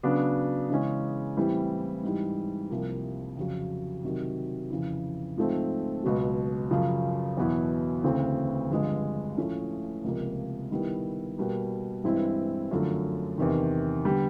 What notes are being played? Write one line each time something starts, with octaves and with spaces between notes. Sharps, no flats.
C#3 F#3 B3 D4
C#3 E3 G#3 C#4
A2 E3 G3 C4
G#2 E3 G3
C2 C3 F3 A#3
F2 C#3 F#3
C3 D#3 F#3
F2 C#3 E3
G#2 F3 A3 C4
C#2 B2 F#3
F#2 C#3 F3
E2 B2 F#3 B3 E4
D2 C#3 E3 A3 C4
G2 D3 F3 G#3
A2 F3 A3 C#4
C#2 C3 F3 A#3
D#3 G3 B3 E4
B2 G3 A#3
G2 E3 G#3 C4 E4
F#2 D3 F3 A3
E2 C3 D#3
D3 G3 B3